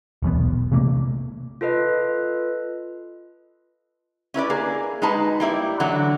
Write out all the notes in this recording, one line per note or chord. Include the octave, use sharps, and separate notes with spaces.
D#1 B1 E3 B3
C3 E3 A3 A#3
F4 A4 B4 D#5
C#4 E4 B4 D5
A#3 G#4
G#3 D#4 F#4 B4 A5
G3 A#3 E4 D5
D3 E3 F#3 F#5